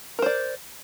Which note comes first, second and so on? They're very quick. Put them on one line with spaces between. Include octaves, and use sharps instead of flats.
A#4 C5 D5